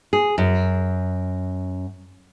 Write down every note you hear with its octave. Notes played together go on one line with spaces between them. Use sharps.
G#4
F#2